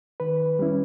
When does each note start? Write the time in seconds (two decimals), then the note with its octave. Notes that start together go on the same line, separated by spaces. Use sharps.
0.20 D#3 B4
0.59 G3 C#4 E4